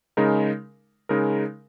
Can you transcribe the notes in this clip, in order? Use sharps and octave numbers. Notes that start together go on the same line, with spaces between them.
C#3 G#3 D#4 A#4
C#3 G#3 D#4 A#4